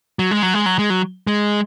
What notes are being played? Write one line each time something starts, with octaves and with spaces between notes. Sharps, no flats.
F#3
G#3
F#3
G#3
F#3
G#3
F#3
G#3